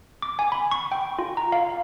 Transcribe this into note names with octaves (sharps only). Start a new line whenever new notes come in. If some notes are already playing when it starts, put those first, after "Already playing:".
D6
G#5
B5
C#6
G5
F4
A#5
F5